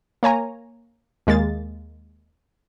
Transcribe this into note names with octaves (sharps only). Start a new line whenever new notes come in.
A#3 C#5 G#5 A#5
D#2 G#3 A#3 A6